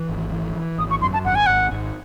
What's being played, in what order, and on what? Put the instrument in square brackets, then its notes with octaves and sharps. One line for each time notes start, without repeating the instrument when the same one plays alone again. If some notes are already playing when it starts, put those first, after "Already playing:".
Already playing: [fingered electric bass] E3
G#1
E3
E3
[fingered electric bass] G#1 [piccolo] D#6
[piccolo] C#6
[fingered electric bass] F#2 [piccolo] C6
[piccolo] A5
[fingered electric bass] G#1 [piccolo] F#5
[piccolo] G#5
[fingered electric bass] G#1 [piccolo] F#5
[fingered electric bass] G#1